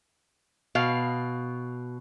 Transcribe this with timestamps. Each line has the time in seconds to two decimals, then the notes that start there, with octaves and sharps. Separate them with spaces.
0.75 B2 F5